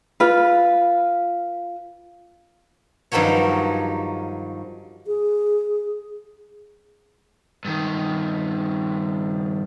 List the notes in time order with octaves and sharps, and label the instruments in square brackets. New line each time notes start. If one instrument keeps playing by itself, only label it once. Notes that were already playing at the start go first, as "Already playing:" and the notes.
[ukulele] F4 B4
[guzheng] G2 D#3 F3 F#3 C#5
[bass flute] G#4
[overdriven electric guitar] G2 D#3